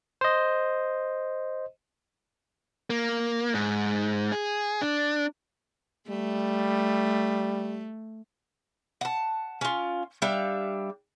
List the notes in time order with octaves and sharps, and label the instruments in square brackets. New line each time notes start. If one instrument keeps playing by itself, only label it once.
[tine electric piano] C5 D#5
[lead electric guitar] A#3
G#2
G#4
D4
[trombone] G3 [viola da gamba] A3
[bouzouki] F#5 A5
C#4 F4
G3 D4 E5 F5